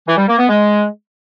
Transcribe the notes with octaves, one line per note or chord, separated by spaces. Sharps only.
E3
G3
A#3
B3
G#3